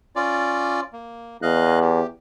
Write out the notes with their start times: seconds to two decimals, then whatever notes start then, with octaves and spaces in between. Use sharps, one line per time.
0.16 C#4 F4 D5
0.93 A#3
1.42 E2 D#5 F5 F#6
1.81 G4